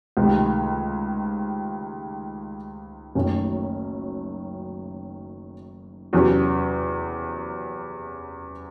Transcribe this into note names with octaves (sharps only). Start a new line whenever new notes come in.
C#2 C3 D#3 A3
F#1 F#2 D#3 A3 C#4
E2 C3 F#3 C#4